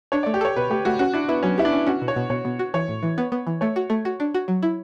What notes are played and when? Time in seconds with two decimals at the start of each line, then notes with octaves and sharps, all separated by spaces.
0.12 D4 C#5
0.23 A3 D5
0.34 G4
0.41 A4 C#5
0.56 B2 B4
0.70 A3 G4
0.85 A3 F#4
0.99 C#4 F#4
1.14 D4 E4
1.28 B3 E4
1.43 F#3 C#4
1.58 E4 G4
1.65 D4
1.72 C#4
1.87 C#4 F#4
2.02 B2
2.08 C#5
2.16 B2
2.30 B2 C#5
2.45 B2
2.59 F#4
2.74 E3 C#5
2.88 A2
3.03 E3
3.18 B3
3.32 B3
3.47 E3
3.61 A3 C#5
3.76 F#4
3.90 A3
4.05 F#4
4.20 D4
4.34 F#4
4.48 F#3
4.63 E4